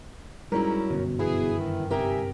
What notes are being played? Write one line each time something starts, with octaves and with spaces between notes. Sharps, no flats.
G#2 F#3 G3 C#4 E4 A#4
G1 F#2 B2
E3 B3 E4 G#4
D#3
C3 D#4 G4 A#4 E5 G5 G#5